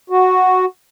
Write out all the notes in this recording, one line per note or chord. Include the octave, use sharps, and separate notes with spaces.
F#4